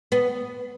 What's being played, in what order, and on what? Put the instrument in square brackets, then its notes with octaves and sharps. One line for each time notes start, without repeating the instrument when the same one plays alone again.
[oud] B3